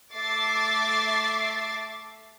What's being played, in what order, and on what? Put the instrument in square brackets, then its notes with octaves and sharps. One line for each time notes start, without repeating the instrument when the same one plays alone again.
[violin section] A3 E5 D6 A6 C7